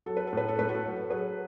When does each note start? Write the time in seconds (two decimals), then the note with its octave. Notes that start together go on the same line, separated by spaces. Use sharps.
0.06 F#3 A4
0.17 B4
0.27 A4
0.33 A2 B4
0.48 A4
0.59 A2 B4
0.69 F#4 A4
0.84 F#3
1.10 F#3 G#4 B4